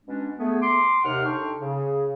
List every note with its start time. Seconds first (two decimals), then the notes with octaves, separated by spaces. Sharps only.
0.06 B2 G#3 C#4 D4
0.39 A3 B3 G#4
0.61 C6 D6
1.04 D#2 C3 D#4 F#5 F6
1.26 D4 D#4 A4 G5 C6 C#6
1.60 C#3